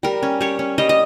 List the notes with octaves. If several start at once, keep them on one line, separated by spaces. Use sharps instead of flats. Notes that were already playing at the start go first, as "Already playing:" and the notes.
G3 A#4
C#4
G3 C#5
C#4
G3 D#5
D#5